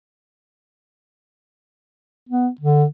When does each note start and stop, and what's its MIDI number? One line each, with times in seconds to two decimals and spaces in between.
2.29 2.48 59
2.61 2.84 50